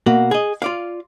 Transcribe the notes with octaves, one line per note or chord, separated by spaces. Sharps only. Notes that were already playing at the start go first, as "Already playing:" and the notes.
B2 A#3 F#4
G#4 D#5
F4 D5 F5